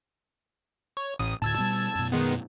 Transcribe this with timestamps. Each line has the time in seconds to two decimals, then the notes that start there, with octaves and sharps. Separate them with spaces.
0.97 C#5
1.19 A1 D#6
1.42 D2 A2 A5 E6 G#6
1.58 B2 G3
1.95 F#2 B2
2.12 D#3 G#3 B3